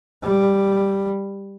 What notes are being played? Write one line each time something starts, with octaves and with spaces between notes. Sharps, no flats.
G3